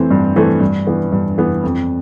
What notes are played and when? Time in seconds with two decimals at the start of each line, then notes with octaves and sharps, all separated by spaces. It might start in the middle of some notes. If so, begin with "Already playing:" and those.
Already playing: E3 A3 C4
0.11 G2
0.36 E3 A3 C4
0.61 G2
0.87 E3 B3
1.12 G2
1.38 E3 B3
1.64 F2